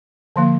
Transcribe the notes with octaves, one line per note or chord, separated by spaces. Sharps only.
D3 F3 A#3